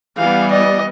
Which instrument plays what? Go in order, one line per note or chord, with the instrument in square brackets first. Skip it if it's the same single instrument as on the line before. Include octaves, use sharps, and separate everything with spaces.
[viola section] E3 G3 B3 [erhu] F5
[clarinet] D5 [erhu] D#5